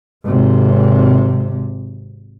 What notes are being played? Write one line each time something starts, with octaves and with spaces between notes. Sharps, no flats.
G#1 C3